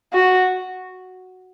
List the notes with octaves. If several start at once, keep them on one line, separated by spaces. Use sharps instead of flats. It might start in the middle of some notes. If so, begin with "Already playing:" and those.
F#4